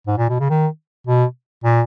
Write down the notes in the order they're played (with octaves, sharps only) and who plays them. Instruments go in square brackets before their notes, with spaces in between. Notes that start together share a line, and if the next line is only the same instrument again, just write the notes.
[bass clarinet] G#2
A#2
B2
C#3
D#3
B2
A#2